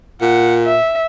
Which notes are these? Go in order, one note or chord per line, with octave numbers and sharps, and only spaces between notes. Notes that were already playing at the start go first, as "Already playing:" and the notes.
A#2 F#5
E5